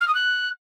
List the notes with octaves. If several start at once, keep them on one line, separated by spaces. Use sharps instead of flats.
F6
D#6
F#6